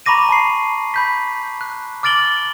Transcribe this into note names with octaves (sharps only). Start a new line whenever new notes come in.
A#5 B5 C#6 D6 A#6 D#7
A5 B5 C7
B5 G6 B6
F#6
D6 F6 A6 D7 F#7 G7